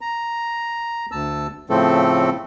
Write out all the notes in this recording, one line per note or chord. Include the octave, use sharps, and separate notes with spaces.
A#5
D2 A5 E6
A2 C#3 F3 A3 C4 A4